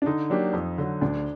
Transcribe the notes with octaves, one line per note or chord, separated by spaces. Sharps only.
D4
D3 D#4
F#3 A#3 D4 G4
F2
D3 F#3
D2 D4